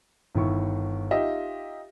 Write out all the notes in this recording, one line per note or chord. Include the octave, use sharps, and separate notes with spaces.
G1 D#3 E4 C#6
D#4 F4 G4 D#5 E5